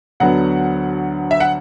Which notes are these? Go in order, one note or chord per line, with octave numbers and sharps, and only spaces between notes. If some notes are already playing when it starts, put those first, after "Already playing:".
D2 D3 F#3 B3 F#5
E5
F#5